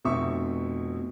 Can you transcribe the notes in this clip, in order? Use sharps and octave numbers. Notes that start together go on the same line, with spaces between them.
F1 B2 C4 E5 C#6